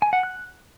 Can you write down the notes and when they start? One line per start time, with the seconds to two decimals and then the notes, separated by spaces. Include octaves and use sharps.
0.02 G#5
0.13 F#5
0.23 F#6